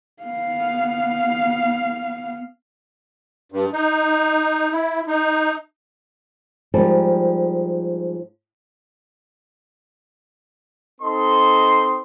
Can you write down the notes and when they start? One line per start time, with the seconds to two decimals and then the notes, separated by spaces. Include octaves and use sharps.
0.23 B3 F5
3.52 G2
3.73 D#4
4.73 E4
5.08 D#4
6.74 G#2 F3 G3 A#4 A5
11.01 C4 D#4 A4 D#5 C6